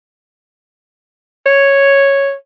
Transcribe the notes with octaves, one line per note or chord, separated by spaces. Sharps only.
C#5